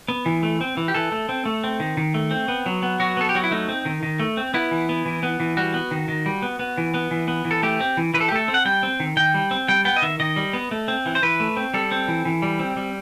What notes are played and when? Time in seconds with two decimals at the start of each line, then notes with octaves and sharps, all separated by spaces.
0.08 B3
0.26 E3
0.43 A3
0.61 C4
0.77 E3
0.88 G4
0.94 E3 A4
1.12 A3
1.29 C4
1.45 A3
1.64 C4
1.80 D#3
1.97 D#3
2.14 A3
2.31 C4
2.48 B3
2.66 F#3
2.83 B3
3.00 F#3 F#4
3.17 B3 A4
3.29 G4
3.35 F#3 F#4
3.43 E4
3.51 A3 D#4
3.69 C4
3.85 D#3
4.03 D#3
4.20 A3
4.37 C4
4.54 B3 E4
4.71 E3
4.89 B3
5.06 E3
5.23 B3
5.40 E3
5.57 G3 F#4
5.74 B3
5.91 D#3
6.08 D#3
6.26 G3
6.42 B3
6.59 B3
6.78 E3
6.94 B3
7.11 E3
7.28 B3
7.45 E3
7.51 A4
7.63 A3 G4
7.80 C4
7.97 E3
8.14 E3 B4
8.21 A4
8.28 G4
8.32 A3 A4
8.48 C4
8.54 F#5
8.65 G3 G5
8.83 C4
9.00 D#3
9.17 D#3 G5
9.34 G3
9.51 C4
9.68 G3 G5
9.85 B3 G5
9.97 D#5
10.02 D#3 E5
10.20 D#3 D#5
10.36 G3
10.53 B3
10.71 A3
10.88 C4
11.06 E3
11.15 C5
11.23 E3 B4
11.40 A3
11.57 C4
11.74 G3 A4
11.91 C4
12.08 E3
12.25 E3
12.42 G3
12.59 C4
12.77 G3